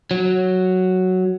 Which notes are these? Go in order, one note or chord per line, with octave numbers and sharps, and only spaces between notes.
F#3